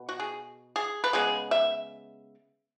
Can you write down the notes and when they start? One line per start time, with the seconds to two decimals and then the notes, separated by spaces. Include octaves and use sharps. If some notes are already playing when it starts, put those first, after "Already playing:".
Already playing: B2
0.09 F#4
0.20 G#4
0.76 G#4
1.04 B4
1.13 C#3 G#3 B3 G#4
1.51 E5